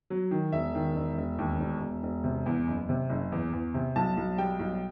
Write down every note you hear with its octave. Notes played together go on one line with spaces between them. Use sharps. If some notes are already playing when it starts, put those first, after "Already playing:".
F#3
D#3
E1 E5
D#3
E1
E1
D#2
E1
E1
E1
C3
E2
F#1
C3
F#1
E2
E2
C3
B1 A5
B1
G3 G5
B1